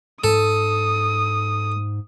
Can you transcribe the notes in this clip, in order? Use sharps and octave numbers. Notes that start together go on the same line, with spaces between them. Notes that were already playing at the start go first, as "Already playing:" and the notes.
G#2 A4 D#6